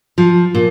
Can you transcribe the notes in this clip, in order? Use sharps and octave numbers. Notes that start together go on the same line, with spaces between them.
F3
A#2